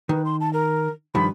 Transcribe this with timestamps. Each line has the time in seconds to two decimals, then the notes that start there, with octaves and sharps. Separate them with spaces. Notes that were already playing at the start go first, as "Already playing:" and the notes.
0.09 D#3 B4
0.25 C6
0.40 A5
0.53 A#4
1.15 G2 D#3 F3 B5